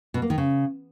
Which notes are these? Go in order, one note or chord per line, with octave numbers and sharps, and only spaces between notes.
B2
A#3
D#3
C#3